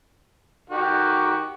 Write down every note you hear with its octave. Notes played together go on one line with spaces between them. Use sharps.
D#3 F#4 G4